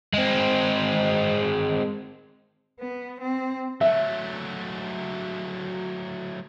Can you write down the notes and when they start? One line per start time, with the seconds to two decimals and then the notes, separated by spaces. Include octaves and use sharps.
0.13 G#3 C4
2.80 B3
3.21 C4
3.81 F#3 A3 E5